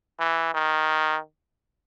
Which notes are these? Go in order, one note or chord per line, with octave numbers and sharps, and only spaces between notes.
E3
D#3